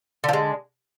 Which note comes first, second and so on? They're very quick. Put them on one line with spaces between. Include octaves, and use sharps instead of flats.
D3 F3 G#3